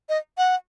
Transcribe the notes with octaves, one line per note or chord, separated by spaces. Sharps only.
D#5
F#5